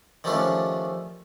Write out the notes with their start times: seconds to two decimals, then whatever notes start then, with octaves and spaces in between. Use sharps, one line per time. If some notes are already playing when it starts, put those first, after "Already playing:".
0.24 D#3 F3 G3 A3 C#4 D4